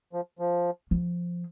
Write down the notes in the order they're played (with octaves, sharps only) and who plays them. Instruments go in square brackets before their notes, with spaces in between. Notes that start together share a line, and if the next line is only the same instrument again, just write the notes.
[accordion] F3
F3
[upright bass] F3